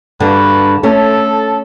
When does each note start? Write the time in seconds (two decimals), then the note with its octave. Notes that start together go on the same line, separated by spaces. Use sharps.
0.20 G2 D3 A#3 F#4 B4
0.83 A3 C#4 A4